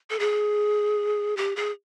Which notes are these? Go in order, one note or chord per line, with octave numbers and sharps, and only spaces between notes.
A4
G#4
G4
G#4